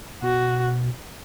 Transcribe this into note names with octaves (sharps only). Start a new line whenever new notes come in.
B2 F#4